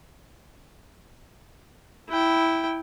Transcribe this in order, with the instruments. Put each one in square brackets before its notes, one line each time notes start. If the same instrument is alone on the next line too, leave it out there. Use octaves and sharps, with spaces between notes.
[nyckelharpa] E4 G5